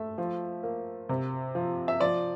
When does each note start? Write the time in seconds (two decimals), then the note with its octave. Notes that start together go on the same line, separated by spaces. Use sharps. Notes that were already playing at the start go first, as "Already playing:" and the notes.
Already playing: A3 E5
0.18 F3
0.63 A#3
1.09 C3
1.55 F3
1.88 E5
2.00 F3 D5